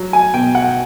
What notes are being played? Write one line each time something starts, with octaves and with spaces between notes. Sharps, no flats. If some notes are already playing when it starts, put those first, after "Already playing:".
Already playing: F#3
G#5
B2 G5
F#5